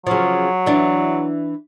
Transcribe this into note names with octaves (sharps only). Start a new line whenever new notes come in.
C#3 F3 F#3
E3 D4